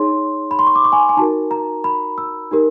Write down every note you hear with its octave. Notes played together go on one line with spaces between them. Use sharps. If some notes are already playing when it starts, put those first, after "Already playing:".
Already playing: D#4 G#4 C#5 C6
B5
C6
C#6
D6
C#6
G#5
G#5
D#4 F#4 A#4 A5
A#5
B5
E6
D#4 G4 A#4